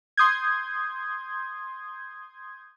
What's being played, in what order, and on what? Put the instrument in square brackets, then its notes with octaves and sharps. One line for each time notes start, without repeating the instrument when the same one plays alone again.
[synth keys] C6 D#6 G6 G#6